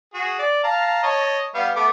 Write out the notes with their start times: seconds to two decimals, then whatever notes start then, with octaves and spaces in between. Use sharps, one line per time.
0.14 F#4 G#4
0.39 D5
0.64 F5 A5 A#5
1.03 C#5 D#5 A5
1.55 G3 B3 F5
1.76 A3 B3 D6